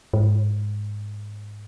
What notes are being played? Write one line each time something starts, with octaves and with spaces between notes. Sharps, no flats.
G#2